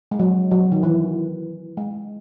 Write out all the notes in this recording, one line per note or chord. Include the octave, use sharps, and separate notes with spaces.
G#3
F#3
F#3
D#3
E3
G#3